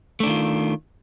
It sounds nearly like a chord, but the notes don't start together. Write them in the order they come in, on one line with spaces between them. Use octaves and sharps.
A3 D4 D#3 F4